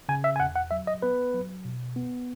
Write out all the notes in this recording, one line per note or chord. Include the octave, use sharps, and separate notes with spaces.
C#3 G#5
E5
G#5
E2 F#5
F#5
F#3 E5
D#5
B3 B4
F#3
B2
B3